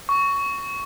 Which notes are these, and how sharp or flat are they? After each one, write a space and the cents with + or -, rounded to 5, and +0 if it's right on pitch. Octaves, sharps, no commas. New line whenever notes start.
C#6 +15